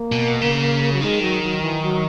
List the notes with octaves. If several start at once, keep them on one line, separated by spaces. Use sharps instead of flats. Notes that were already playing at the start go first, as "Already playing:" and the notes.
Already playing: A#3
B2
C#3
F#3
D#3 G#3
F#3
F#3
E3
F#3